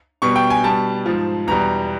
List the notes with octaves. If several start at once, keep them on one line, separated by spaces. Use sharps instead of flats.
B2 G3 C#6
G5
G#5
B2 G3 A5
G#2 F3
E2 B2 G3 A#5